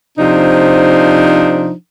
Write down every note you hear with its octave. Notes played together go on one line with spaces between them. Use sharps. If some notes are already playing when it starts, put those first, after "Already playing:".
C3 F3 D4 D#4 C5